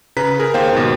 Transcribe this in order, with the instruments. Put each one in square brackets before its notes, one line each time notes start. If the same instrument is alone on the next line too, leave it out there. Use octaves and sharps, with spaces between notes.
[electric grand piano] C#3 B4 A#5 B6
G#4 A#4
D#2 A#3 C5 F5 G5
D#2 G#2 B2